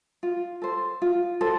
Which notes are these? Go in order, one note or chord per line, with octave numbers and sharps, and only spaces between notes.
F4
A4 C5
F4
A4 C5